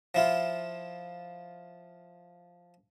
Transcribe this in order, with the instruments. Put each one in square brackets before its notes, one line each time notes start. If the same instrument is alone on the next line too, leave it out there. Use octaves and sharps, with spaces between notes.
[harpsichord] F3 E4 F4